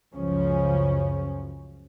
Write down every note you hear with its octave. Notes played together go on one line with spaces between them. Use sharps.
C#2 F#2 C#3 F3 C#4